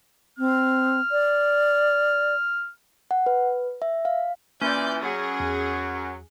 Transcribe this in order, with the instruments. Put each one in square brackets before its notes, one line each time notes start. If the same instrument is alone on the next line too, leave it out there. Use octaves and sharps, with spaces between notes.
[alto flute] C4 [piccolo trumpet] F6
[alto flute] D5
[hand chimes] F#5
B4
E5
F5
[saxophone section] A#2 E3 [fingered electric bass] A#3 [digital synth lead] C#4 [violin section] D5 G6
[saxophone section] F#2 F#3 [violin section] G#4
[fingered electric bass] E2